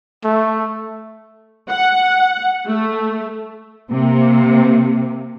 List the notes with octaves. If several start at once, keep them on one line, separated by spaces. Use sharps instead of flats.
A3
F#5
A3
C3 A#3